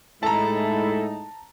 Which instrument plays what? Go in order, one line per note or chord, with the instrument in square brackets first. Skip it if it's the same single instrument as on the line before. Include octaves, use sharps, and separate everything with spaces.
[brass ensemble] A2 G#3 D#4 [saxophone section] E4 A4 [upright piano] A5 A#5